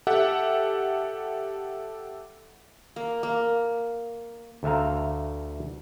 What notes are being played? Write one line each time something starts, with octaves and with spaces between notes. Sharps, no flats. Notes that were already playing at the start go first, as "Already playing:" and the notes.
G4 A4 E5 F#5
A#3
A#3
D2 A3 E5 F5 A#5